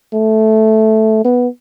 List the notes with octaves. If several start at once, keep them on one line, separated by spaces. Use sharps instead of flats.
A3
B3